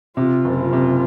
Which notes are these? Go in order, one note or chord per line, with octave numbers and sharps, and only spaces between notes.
C3 F4
F#1
F4
C3